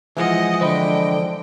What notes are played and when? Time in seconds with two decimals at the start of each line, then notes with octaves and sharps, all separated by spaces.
0.17 E3 F3 G#3 D#5 F#5
0.61 D3 C5 D#5 G5 B5